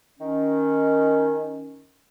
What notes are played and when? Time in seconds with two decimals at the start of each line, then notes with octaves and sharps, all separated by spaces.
0.20 D#3 C#4